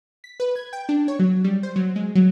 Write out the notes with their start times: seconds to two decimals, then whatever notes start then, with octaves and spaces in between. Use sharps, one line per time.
0.24 B6
0.40 B4
0.56 G#6
0.73 G5
0.89 D4
1.08 C#5
1.19 F#3
1.44 G3
1.63 C5
1.76 F#3
1.96 G#3
2.15 F#3